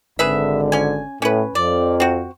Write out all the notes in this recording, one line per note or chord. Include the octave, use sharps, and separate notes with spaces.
G#1 D3 G#4 B4 E5
C#4 G#5
A2 C#4 B4
F2 D5
C4 F#4